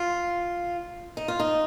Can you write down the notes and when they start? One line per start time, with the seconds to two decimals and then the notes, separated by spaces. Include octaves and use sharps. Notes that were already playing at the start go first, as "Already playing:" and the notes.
Already playing: F4
1.17 D#4
1.28 F4
1.40 D#4